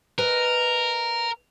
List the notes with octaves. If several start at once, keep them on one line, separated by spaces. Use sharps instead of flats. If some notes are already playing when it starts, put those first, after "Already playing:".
A#4 B4 D#5 G#5